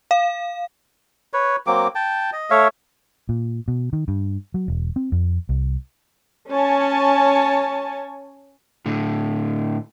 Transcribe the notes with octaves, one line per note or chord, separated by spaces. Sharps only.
F5
B4 C#5
F#3 A#3 C4 D6
G5 A5
D#5
A3 C#5 E5 F5
A#2
B2
D#3
G2
F#3
E1
C4
F2
C2
C#4 C#5 G#5 A5
A2 D3